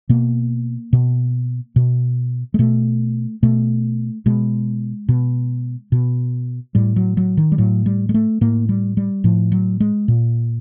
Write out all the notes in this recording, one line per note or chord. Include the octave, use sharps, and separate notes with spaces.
B2 A#3
B2
B2
G#3
B2 A3
B2 A3
B2 G#3
B2
B2
A2 G3
F#3
F#3
D#3
G3
A2 F#3
G3
G#3
A3
A2 A#3
G3
G3
A2 F3
F#3
G#3
A#2